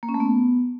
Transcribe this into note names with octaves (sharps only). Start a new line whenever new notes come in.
A#3
C#4
A3
B3